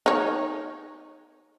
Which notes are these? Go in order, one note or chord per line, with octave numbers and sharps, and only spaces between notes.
D#4 C#5